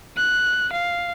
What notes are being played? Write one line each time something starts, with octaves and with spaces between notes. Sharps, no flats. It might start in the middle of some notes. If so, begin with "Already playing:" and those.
F#6
F5